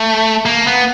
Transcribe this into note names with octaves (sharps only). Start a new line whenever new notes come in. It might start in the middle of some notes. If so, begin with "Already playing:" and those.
Already playing: A3
A#3
B3